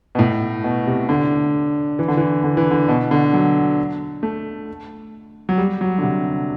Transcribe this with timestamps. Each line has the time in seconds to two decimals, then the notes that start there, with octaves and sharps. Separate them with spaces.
0.15 B2
0.19 A2
0.64 B2
0.87 C3
1.09 D3
1.99 E3
2.08 D3
2.17 E3
2.44 D3
2.57 E3
2.71 D3
2.88 B2
3.11 D3
3.33 F#3
4.23 A3
5.49 F#3
5.58 G3
5.81 F#3
5.98 D3
6.03 C3